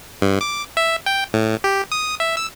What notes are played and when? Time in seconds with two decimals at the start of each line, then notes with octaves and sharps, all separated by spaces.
0.22 G2
0.41 D6
0.77 E5
1.06 G5
1.34 A2
1.64 G4
1.92 D#6
2.20 E5
2.37 E6